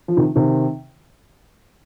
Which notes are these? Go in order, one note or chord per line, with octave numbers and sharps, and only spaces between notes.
F3
C3 D#3
C3 D#3